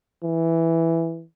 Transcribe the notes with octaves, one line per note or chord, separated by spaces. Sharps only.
E3